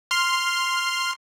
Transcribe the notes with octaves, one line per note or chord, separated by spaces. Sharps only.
C6 F6